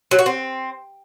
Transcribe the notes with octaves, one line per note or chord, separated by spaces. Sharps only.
F#3
F#4
C4